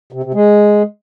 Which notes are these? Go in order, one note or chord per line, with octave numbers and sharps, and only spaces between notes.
C3
C3
G#3